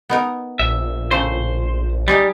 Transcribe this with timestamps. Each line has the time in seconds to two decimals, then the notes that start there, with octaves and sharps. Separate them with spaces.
0.09 B3 D#4 A#4
0.59 A#1 E5
1.11 A2 C#3 A3 C5
2.08 G3 D#4 G4 G#4